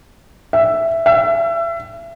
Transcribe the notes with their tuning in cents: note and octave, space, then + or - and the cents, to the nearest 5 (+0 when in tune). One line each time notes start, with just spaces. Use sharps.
E5 +5
E5 +30